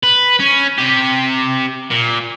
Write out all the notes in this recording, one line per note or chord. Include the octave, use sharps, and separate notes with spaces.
B4
C#4
C3 G4
A#2